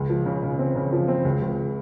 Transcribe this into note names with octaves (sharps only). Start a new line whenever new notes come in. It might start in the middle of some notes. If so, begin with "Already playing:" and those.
Already playing: C#2
F3
C#3
C#3
C4
C#3
F3
C4
C#2
C#2